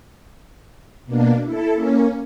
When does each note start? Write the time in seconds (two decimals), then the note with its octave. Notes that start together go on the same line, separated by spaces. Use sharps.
1.06 B2 A#3 D4
1.44 E4 A4
1.73 A#3 C#4